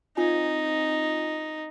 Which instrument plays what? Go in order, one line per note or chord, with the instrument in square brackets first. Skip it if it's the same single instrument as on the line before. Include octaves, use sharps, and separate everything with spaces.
[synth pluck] C4 F4 G#5 [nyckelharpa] D#4